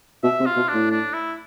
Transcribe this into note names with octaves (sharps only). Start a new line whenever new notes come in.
B2 E5
C3
F4
B2
A2 D4
D4
E4